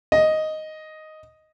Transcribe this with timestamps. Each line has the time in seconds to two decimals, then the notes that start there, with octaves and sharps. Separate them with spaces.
0.12 D#5